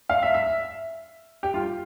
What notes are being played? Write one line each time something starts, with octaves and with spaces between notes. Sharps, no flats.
F5
E5
E5
G4
F4